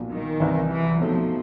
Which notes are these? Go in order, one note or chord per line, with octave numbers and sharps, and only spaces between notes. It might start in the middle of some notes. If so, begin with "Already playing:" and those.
Already playing: B1 A#2 F3
D#3
C2 C3 E3
E3
B2 F3 F#3 A3 C4 D#4